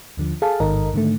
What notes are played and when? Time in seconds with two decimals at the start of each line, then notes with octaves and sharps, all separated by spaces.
0.17 D#2 D3 F3
0.42 G#4 A4 F5 A5
0.60 A1 G#2 D#3 A4 A#4 D#5
0.93 G#2 D3 D#3 A3